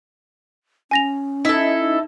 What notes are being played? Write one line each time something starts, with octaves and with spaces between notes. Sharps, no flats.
C#4 G#5 A#6 F7
D#4 E4 A4